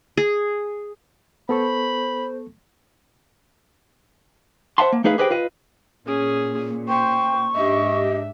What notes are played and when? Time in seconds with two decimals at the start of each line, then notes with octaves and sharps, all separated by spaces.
0.17 G#4
1.49 B3 A4 C5 B5 C#6
4.78 C5 D#5 E5 F#5 A5 C6
4.93 A#3
5.04 A3 D#4 G#4 B4 F5
5.18 G4 G#4 B4 C5 D#5 G5
5.30 F4 B4 D#5
6.06 A#2 C#4 G#4
6.88 C5 G5 C#6
7.55 G#2 D4 G4 D#5 E5